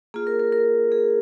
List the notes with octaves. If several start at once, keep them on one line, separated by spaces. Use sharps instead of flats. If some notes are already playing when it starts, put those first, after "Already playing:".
A#3 F4 G#4
A#4
A#4
A#4
G#4